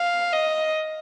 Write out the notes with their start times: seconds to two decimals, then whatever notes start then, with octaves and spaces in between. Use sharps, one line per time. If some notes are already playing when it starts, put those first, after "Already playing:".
Already playing: F5
0.33 D#5